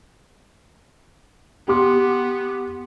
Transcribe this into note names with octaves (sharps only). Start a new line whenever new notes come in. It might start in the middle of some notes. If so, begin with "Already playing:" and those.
B3 G4 C6 D6